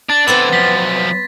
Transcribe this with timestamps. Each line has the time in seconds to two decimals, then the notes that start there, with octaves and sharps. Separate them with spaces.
0.10 D4 A6
0.28 D3 B3 C4 E4 D5
0.53 F#2 F3 B6